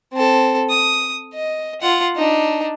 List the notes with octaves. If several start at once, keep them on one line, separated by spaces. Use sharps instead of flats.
C4 A4
D#6
D#5
F4 F#5
D4 D#4